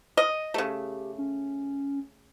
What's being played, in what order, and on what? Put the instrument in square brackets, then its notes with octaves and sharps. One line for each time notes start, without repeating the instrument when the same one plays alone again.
[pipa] D#5 [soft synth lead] A#6
[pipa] C#3 A3 [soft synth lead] G4
[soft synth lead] C#4